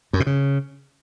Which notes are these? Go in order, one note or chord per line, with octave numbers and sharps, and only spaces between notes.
F#2
B2
C#3